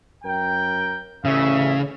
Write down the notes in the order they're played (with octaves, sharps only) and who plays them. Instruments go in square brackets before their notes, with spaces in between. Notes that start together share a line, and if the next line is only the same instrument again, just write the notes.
[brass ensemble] F#2 A#4 G5
[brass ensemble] A1 D2 E5 [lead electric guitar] C#3